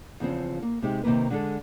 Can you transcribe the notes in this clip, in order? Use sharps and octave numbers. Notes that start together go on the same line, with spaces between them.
E2 C#3 F3 C4
A#3
C3 G#3 C4 D#4 G4
C3 D#3 E3 A#3 B4
D3 G#3 A4